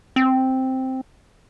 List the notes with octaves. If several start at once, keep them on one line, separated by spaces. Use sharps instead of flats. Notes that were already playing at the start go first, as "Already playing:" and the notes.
C4